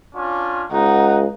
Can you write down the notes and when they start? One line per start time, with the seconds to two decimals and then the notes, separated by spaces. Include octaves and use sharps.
0.15 C#4 D4 F4
0.72 C#2 D#4 F#5